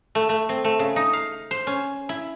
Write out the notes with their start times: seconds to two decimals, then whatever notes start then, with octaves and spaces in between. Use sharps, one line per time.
0.15 A3
0.29 A3
0.49 C4
0.65 A3
0.79 C#3
0.96 D#4
1.13 F5
1.51 C5
1.67 C#4
2.09 E4